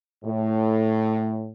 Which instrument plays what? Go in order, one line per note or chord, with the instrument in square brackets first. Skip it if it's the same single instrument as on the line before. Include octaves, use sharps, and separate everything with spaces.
[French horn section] A2